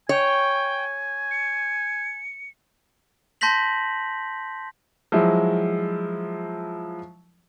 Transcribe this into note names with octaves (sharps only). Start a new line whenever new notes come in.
C#5 G5 G#5
C#7
A5 C6 G6 A#6 B6 F#7
F3 F#3 G#3 E4